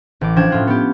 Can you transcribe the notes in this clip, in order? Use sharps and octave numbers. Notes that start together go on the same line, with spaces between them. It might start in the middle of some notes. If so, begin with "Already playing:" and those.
A1 D6
F3 C#4 D4 G5 G#6 E7
A2 F4 F#5
B3 G4